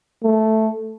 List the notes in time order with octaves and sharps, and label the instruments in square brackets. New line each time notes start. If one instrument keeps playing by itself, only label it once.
[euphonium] A3